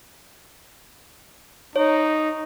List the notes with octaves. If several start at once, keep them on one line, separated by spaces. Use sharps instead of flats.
D#4 C#5